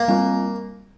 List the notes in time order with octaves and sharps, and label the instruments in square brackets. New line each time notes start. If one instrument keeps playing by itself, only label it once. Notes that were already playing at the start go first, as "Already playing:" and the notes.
Already playing: [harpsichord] A#3
[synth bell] G3 C4 F4 A#4